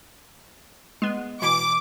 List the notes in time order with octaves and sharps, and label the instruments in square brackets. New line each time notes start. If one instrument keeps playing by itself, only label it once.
[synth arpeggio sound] G#3 B3
[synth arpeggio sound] B2 E3 D7 [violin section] D6